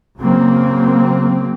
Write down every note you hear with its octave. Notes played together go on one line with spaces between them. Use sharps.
C#3 F#3 A#3 C4